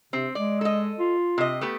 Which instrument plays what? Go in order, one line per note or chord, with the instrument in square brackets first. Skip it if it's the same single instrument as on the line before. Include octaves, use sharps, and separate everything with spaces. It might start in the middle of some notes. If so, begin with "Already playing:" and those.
[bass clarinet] C3 [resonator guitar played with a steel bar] C4
[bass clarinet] G#3 [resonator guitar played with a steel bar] D5
[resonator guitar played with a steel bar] A4 D#5
[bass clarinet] F4
[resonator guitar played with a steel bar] C3 D#5
A3 B3 G4